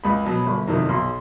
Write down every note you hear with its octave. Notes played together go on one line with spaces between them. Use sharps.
C#2 B5
B2 F#3
G1
F2 C3 D#3 F#3
B1 C6